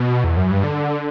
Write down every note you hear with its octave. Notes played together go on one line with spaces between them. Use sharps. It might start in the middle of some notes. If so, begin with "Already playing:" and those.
Already playing: B2
E2
F#2
G2
D3